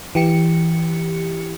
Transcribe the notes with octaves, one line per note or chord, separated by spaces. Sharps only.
E3 G4 C#7